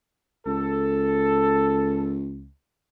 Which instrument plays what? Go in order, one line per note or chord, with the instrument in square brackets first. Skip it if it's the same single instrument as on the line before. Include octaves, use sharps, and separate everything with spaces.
[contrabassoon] C#2 [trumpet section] A4